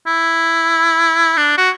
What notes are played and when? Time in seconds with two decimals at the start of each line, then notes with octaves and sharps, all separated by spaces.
0.07 E4
1.37 D4
1.58 F#4